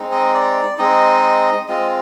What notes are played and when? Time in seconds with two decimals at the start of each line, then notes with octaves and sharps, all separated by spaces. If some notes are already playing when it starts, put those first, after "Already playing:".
Already playing: G#3 C4 D#4
0.12 D#5
0.34 D5
0.78 G#3 C4 D#4 D#5
1.68 G#3 C4 F4 D#5